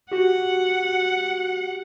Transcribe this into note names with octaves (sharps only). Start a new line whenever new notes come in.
F#4 G4 F#5